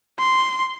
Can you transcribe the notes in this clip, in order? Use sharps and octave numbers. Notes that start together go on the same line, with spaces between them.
C6